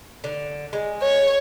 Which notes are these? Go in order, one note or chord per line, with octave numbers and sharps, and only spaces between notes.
D3
G#3
C#5